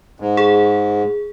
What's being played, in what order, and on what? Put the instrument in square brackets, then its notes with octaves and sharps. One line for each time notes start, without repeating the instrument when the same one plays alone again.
[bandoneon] G#2
[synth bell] G#4